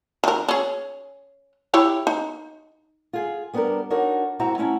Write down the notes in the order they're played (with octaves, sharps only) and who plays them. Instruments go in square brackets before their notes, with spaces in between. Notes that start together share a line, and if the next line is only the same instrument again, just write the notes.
[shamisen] D#3 A#4
C#4 G#4
E4 G4 C#5
D#4
[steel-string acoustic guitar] F4 G#4
G3 B3 D4 G4 A#4
D4 D#4 F#4 A#4 C#5
G#2 C4 E4 F#4 E5 A#5
A3 C#4 E4 A5